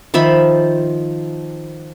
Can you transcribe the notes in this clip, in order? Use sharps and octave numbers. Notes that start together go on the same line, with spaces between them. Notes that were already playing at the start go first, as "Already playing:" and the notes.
D#3 F3 E5 B5